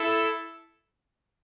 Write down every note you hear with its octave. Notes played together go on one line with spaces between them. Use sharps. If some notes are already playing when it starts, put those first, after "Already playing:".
Already playing: E4 A4